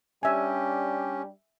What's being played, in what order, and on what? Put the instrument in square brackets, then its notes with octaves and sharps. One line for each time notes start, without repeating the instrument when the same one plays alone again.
[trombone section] G3 D4 G4 [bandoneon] C#4 [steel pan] E5 G#5